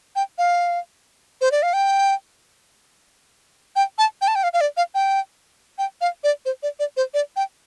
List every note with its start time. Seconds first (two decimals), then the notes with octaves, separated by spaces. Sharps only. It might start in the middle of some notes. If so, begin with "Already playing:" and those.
0.16 G5
0.38 F5
1.41 C5
1.51 D5
1.63 F5
1.73 G5
3.76 G5
3.98 A5
4.21 G5
4.28 A5
4.35 G5
4.43 F5
4.53 F5
4.61 D5
4.77 F5
4.95 G5
5.78 G5
6.01 F5
6.24 D5
6.45 C5
6.63 D5
6.79 D5
6.97 C5
7.14 D5
7.36 G5